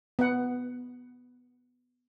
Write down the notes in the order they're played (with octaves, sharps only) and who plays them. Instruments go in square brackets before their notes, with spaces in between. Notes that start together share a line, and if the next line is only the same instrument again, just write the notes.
[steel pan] B3 F#5